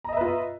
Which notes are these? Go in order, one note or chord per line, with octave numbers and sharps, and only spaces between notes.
F4 B4 D#5 E5 A#5